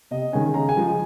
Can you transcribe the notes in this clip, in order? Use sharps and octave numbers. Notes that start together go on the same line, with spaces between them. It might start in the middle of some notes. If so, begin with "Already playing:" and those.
C3 D#5
D#3 G#3 C#4 G#5
C#3 A#5
G#5
F3 G#3